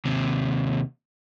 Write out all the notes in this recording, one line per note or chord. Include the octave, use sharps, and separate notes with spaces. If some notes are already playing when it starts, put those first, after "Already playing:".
D#2 C3